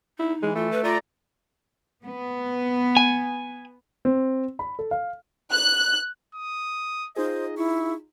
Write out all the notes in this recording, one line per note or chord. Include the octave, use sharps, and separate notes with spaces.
D#4 E4
E3 G#3
A3 F4
B4
F4 D5 A#5
B3
G#5
C4
B5
A4
F5
F#6
D#6
D#4 F4 G#4 C5 D#5
E4 C#6